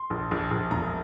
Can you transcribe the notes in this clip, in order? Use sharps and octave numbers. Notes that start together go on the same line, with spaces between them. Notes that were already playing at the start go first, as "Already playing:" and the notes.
Already playing: C6
A#1
A#1
A#1
E1 A#5